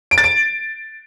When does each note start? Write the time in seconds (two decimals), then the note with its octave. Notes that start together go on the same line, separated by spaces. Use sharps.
0.11 D7
0.18 A6
0.24 D7